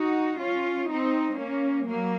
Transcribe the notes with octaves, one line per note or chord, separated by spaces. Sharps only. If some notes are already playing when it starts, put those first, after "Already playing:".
Already playing: D#4 F#4
C#4 F4
C4 D#4
A#3 C#4
F#3 A#3